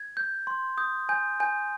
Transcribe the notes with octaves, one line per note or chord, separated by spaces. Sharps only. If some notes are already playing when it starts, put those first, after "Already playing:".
Already playing: G#6
G6
C6
D#6 G6
G#5 G6
G#5 G6